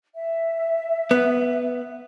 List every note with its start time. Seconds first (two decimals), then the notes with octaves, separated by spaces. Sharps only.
0.15 E5
1.11 B3